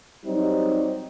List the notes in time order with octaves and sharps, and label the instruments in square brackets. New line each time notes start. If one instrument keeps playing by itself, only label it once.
[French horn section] F#3 G3 C4 D#4 G4